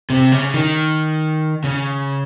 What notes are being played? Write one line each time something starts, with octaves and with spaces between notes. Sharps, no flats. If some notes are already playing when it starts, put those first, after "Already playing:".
C3
C#3
D#3
C#3